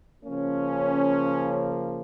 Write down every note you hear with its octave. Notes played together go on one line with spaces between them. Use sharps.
C#3 F3 A#3 C#4